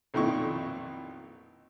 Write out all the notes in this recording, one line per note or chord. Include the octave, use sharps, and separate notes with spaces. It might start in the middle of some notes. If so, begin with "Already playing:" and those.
B1 F2 A#2 D#3 E4 C#6